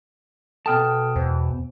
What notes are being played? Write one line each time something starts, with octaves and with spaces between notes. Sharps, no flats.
B2 A4 G5 A5 D#6 F6
E2 C5